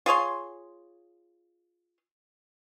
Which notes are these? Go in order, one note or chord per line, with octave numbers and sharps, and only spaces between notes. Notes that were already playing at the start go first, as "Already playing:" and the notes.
F4 G#4 C#5 C6